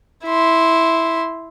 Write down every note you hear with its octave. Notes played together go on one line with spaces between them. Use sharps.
E4 C6